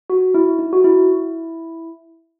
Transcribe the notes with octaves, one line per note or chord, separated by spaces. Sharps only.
F#4
E4
D#4
F#4
E4